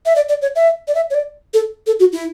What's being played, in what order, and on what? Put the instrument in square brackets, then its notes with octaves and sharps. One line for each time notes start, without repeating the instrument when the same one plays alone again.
[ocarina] E5
D5
D5
C#5
E5
D5
E5
C#5
D5
A4
A4
F#4
E4